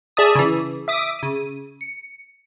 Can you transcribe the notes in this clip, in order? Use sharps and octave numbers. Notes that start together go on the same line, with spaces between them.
G#4 D5 E5 A5 D#6
C#3 E3
E5 D6 D#6
C#3 D#7
C#7